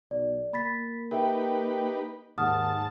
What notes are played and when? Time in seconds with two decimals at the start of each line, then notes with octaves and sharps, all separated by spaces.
0.11 B1 D5
0.53 A#3 B5 A6 B6
1.11 D#4 G4 A#4 B4 E5 G5
2.38 D#2 G#2 F#5 A5 D#6 F6